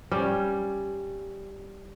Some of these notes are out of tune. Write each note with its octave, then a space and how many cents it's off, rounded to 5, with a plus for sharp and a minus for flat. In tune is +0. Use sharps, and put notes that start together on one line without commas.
G3 +0 C#4 +0